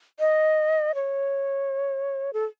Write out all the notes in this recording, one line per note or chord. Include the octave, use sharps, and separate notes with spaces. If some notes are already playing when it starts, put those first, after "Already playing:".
D#5
C#5
A4